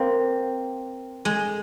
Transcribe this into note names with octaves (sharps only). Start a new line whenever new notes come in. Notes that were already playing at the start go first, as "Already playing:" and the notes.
Already playing: A#3 C4
G#3